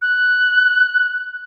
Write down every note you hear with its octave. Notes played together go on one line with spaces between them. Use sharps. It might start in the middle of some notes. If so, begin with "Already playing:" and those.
F#6